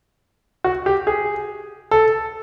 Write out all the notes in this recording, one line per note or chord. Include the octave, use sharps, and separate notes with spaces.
F#4
G4
G#4
A4